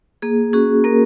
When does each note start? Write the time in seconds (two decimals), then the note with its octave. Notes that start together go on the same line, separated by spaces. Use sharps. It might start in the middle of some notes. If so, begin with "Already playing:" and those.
0.22 A#3 G#4
0.53 C#4 F#4 G#4
0.84 A#3 A#4